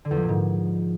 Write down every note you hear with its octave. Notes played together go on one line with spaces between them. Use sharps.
D3
E2
F3
A#2
G#2